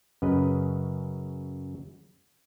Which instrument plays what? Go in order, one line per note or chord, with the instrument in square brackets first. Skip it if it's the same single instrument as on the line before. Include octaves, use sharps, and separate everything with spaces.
[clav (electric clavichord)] F#2 C#3 B4 D#5